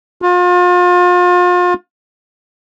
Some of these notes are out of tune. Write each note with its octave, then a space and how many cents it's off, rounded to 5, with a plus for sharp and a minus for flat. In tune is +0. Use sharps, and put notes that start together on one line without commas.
F4 +35